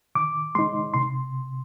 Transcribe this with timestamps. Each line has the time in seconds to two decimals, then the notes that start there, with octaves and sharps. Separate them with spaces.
0.15 D#3 D6
0.55 G#3 D#4 C6
0.94 C3 C6